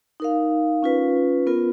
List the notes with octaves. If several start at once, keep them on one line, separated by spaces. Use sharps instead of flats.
D#4 A#4 F5
C#4 F4 B4
B3 F4 A#4